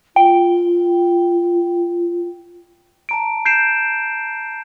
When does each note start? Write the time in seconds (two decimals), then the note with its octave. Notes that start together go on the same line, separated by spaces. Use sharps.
0.16 F4 G5
3.09 A5 A#5 D7
3.46 G6 C7 D7 E7